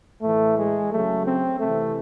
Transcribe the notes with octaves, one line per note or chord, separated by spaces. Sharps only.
A2 E3 A3
G#3
C#3 F#3 A3
C4
C3 A3
E3